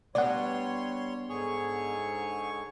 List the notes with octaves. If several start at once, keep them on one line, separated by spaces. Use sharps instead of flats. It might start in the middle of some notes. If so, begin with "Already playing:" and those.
G3 B3 D4 F#4 C#5 D5 F#5 C6
G#2 D3 G#4 C#5 C#6